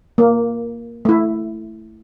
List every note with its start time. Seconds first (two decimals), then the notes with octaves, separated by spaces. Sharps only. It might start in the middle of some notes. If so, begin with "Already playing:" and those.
0.18 A#3
1.05 A3 E4